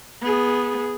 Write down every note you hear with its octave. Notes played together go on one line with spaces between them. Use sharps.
B3 G#4